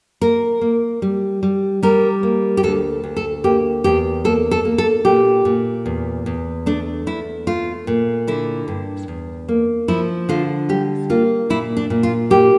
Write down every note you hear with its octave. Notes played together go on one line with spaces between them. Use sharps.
A#3 A#4
A#3
G3
G3
G3 A#4
A#3
G4
D2 A4
D2
A4
A#3 G4
E2 G4
A#3 A4
A4
A#3
A4
A#2 G4
A#2
E2
E2
A3 D4
E2 E4
A3 F4
A#2
D3 E4
G2
E2
A#3
F3 E4
D3 F4
G3 G4
A#3 F4
A#2 E4
D4
A#2
F4
A#3 G4